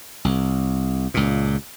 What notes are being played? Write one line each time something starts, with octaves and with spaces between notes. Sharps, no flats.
C2
C#2 A#2